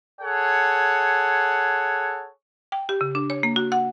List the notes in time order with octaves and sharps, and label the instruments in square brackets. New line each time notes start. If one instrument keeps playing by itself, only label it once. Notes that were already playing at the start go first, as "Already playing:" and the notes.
[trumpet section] G#4 A4 C#5 F#5
[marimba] G5
G4
C#3
D4
C#5
A#3
F#4
F#5